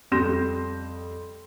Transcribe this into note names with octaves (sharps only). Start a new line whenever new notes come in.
F2 G3 C6 G6 A#6 E7